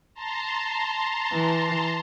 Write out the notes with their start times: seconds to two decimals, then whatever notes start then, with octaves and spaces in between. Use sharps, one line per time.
0.14 A5 A#5 C6
1.32 E3